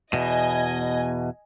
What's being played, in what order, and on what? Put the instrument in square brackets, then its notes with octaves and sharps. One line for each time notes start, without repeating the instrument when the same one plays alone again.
[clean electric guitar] E2 B2 [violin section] D#5 G#5